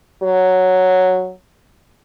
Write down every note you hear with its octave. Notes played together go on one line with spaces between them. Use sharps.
F#3